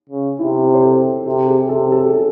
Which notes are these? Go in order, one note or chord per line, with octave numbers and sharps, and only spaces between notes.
C#3
C3 E4
C5
A4
C3 A4
G#4
C3 A4
A4
G#4
A4